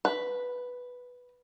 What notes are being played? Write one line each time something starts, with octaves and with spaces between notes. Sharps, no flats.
B4